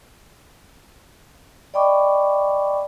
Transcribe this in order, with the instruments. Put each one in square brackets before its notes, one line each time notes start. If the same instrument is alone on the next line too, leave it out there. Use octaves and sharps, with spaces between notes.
[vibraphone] D5 D#5 G5 B5 C#6 D6